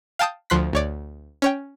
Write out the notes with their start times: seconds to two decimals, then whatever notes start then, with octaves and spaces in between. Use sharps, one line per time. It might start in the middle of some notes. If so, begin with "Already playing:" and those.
0.19 F5 G5 A5 D#6 G6
0.50 D2 F3 C6 F#6 B6
0.73 D2 C#5 D5
1.42 C#4 C#5 G5